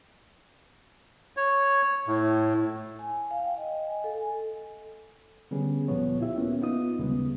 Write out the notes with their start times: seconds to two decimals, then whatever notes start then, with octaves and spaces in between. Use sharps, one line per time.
1.37 C#5
2.07 A2
2.99 G#5
3.31 F5
3.45 G5
3.57 D#5
3.87 G#5
4.04 A4
4.18 G#5
5.51 D3 G3 B3 C#4 G#4
5.88 D2 A#2 F3 B3 C#5
6.20 E4 F4 G4 E5
6.38 A#3 B3 C#4
6.62 B3 D#4 F4 D#6
6.98 D#2 C#3 G3 G#3 B3